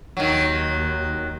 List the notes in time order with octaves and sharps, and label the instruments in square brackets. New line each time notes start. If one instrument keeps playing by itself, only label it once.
[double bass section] D#2 [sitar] D#3 F#3